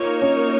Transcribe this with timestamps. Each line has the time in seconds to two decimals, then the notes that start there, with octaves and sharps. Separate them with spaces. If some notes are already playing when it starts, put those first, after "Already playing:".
Already playing: A#3 D#4 F4 A#4 C#5
0.22 C#4